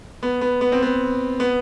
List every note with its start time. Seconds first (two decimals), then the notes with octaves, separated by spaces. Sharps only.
0.23 B3
0.41 B3
0.61 B3
0.72 C4
0.82 B3
1.40 B3